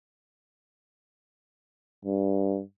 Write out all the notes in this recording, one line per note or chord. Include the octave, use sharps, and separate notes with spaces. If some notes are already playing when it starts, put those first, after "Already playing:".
G2